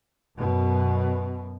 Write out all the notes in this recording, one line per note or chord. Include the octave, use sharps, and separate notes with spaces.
F#2 B2